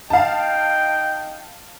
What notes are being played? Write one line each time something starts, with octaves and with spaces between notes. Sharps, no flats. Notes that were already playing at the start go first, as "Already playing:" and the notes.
D#4 F5 G5 A5